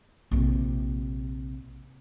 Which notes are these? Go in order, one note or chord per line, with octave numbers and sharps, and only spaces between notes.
A#1 C3